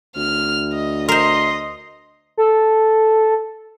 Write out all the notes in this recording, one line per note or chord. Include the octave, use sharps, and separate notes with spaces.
D2 F6
D#5
A#4 C5 D#5 C6
A4